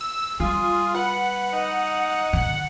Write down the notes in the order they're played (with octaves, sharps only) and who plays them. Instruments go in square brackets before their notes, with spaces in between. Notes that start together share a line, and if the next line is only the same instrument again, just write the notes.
[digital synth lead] E6
[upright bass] G3 [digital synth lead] F4 [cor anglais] G#4
[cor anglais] B4 [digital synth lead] F#5
[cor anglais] D#4
[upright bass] D3 [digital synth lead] F#5